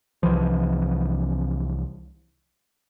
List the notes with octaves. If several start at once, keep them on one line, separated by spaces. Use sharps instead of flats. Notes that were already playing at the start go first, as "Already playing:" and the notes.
C2 E3 F3